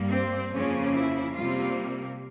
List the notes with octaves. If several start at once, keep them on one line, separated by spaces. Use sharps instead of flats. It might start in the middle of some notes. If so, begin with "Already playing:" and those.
Already playing: G2 G3 A#3
C4
F2 C#3 F3 A#3 C#4
E4
C3 G3 A#3 F4